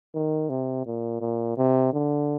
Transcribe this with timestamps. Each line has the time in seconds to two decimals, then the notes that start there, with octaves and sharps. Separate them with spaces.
0.15 D#3
0.50 C3
0.86 A#2
1.21 A#2
1.57 C3
1.93 D3